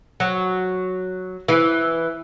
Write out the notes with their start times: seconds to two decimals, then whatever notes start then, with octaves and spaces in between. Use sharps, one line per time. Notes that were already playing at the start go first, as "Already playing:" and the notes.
0.20 F#3
1.48 E3